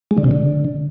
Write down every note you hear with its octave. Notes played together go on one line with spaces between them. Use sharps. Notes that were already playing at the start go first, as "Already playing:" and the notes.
G#3
D3
C3
D3